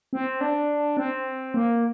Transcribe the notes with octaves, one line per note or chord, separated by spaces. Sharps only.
C4
D4
C4
A#3